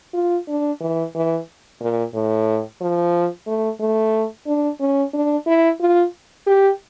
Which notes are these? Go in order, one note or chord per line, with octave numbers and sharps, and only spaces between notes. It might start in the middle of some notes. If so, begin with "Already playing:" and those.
F4
D4
E3
E3
A#2
A2
F3
A3
A3
D4
C#4
D4
E4
F4
G4